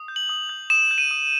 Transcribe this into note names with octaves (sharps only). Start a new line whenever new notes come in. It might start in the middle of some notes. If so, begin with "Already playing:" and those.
Already playing: D#6
G6
F#7
D#6
G6
D#6 E7
G6
D#7
D#6